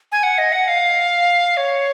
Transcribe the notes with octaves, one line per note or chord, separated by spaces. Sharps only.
G#5
F#5
D#5
F#5
F5
C#5